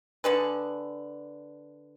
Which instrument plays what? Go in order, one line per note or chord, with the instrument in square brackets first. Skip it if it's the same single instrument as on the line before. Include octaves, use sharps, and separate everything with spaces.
[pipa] D3 G#4 B4